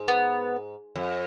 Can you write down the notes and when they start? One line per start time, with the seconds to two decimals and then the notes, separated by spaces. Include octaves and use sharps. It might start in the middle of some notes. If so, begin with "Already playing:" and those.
Already playing: G#2
0.08 B3
0.96 F2